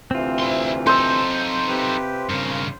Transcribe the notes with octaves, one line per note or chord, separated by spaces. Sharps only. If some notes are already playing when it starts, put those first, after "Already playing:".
D2 C3 E3 C4 F4
E4 C6
D#4 A4 C5 E6
C3 G4 B4
G2 C#3 A#4